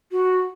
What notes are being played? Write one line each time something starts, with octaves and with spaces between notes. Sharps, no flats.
F#4